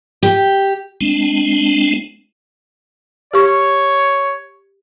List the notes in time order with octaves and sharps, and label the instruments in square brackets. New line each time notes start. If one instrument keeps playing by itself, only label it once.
[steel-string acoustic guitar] G4
[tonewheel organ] G#3 C4 D4
[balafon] G4 C#6 [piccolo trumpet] C#5